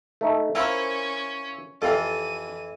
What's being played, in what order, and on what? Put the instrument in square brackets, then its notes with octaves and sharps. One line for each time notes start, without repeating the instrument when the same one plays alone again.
[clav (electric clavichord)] A3 D#4 E5
[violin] C#4 [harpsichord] E4 F4 [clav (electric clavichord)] A#4 C5 [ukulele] A#5
[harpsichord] F2 E3 [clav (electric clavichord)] F4 G4 [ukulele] A4 F5 [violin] D#7